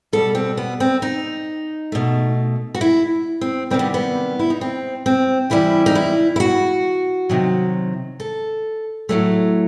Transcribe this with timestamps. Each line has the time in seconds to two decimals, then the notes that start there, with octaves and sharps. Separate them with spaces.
0.13 B2 G3 A4
0.35 C4
0.57 B3
0.80 C4
1.02 D#4
1.92 B2 A3
2.74 F#4
2.81 E4
3.41 C4
3.70 C3 D#3 G3 C4
3.79 B3
3.94 B3
4.39 E4
4.50 D#4
4.61 C4
5.06 C4
5.50 C3 E3 G3 E4
5.86 D#4
5.95 E4
6.36 E4
6.40 F#4
7.29 C3 D#3 F#3
8.20 A4
9.09 A2 F#3 A3